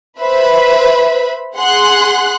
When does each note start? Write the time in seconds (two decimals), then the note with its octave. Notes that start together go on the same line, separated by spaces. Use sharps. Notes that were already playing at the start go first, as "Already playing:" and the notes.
0.20 B4 C5 E5 B5
1.57 G#4 F#5 C6 F#6